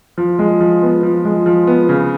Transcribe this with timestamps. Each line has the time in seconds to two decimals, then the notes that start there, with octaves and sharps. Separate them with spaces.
0.18 F3
0.39 G#3
0.60 F3
0.82 B3
1.03 F3
1.25 G#3
1.46 F3
1.67 B3
1.89 C#3